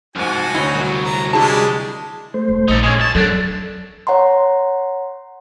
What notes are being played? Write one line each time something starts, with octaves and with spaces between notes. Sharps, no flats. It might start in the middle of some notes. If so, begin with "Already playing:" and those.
C2 G#2 F3 F#4 G#5
D2 D#4 E4 C#5
C2 F#3
A#5
G3 G#3 D4 E4 G#4 A5
A3 C5
E1
A#1 D#4 A4
G#3 C#4 G#6
D2 A5
F#2 F#3 D4 A4
C#5 F#5 A#5 C6